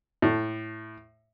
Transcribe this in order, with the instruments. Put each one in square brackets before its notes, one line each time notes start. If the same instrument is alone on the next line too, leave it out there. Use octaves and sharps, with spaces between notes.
[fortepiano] A2